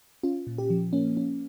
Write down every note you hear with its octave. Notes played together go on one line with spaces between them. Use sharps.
C#4 F4
A#2
G4
F3
A#3 C#4
C#4